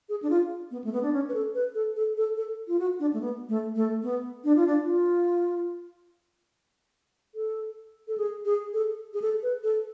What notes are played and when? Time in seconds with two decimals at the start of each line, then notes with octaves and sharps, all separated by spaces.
0.09 G#4
0.23 D4
0.30 F4
0.71 B3
0.84 A3
0.93 B3
1.03 D4
1.13 C#4
1.29 B4
1.34 A4
1.55 B4
1.75 A4
1.96 A4
2.17 A4
2.37 A4
2.68 F4
2.79 F#4
3.00 D4
3.13 A3
3.21 B3
3.49 A3
3.75 A3
4.03 B3
4.44 D4
4.56 F4
4.67 D4
4.86 F4
7.35 A4
8.08 A4
8.18 G#4
8.45 G#4
8.73 A4
9.14 G#4
9.22 A4
9.43 B4
9.63 A4